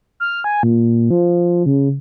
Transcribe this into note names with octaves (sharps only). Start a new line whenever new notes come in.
F6
G#5
A#2
F3
C#3